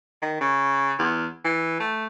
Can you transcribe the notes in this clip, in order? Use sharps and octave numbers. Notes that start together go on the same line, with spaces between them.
D#3
C#3
E2
E3
A3